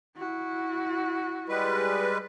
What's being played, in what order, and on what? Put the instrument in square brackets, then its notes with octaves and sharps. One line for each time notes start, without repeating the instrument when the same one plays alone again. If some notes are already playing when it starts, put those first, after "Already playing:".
[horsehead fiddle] E4 F#4
[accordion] G3 G#3 B4